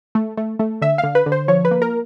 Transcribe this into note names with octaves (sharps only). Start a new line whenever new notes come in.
A3
A3
A3
D3 E5
F5
D3
B4
D3
C5
F3 C#5
B4
A#3
A#4